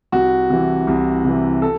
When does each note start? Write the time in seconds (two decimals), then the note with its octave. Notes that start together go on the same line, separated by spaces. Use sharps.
0.12 C2 F#4
0.50 C3 E3
0.87 C2
1.24 C3 E3
1.62 A4